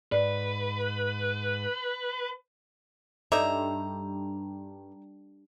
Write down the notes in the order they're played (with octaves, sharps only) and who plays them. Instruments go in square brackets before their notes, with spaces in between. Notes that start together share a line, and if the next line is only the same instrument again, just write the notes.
[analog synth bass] G#2 [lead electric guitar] B4 [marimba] D5
[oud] G2 [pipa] D#4 E5 [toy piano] A4 D5 D6 [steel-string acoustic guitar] A#5